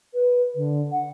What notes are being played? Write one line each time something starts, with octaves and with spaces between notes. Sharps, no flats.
B4
D3
F#5